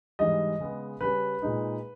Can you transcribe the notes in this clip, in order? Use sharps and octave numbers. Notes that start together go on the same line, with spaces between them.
G#2 E3 G3 D#5
C#3 G#3 B3
C#3 G3 C#4 B4
A#2 G#3 D#4